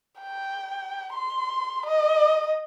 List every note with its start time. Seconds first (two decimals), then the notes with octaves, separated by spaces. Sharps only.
0.21 G5
1.14 C6
1.86 D#5